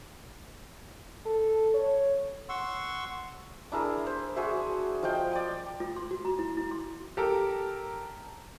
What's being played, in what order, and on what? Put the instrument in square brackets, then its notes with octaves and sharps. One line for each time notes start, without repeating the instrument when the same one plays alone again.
[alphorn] A4
C#5
[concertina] F#5 C6 C#6 E6
[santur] D4 E4 G#4 A#4
C5
F#4 G#4 C5 E5
F3 F4 D#5 G5
D5 G5 D#6
[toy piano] F4
C6
F#4
A#5
E4
E4
C6
[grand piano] G4 A4 A#4